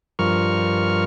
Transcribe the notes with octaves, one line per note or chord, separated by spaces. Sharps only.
G2 F3 A#4 C#6 F6